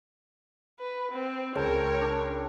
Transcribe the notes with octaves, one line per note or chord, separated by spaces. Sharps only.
B4
C4
C#2 C#3 A4 A#4 C#5 G5
D4